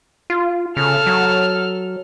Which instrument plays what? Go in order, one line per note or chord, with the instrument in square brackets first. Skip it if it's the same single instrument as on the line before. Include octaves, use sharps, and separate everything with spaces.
[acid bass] F4
[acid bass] C#3 [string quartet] A4 F6
[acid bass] F#3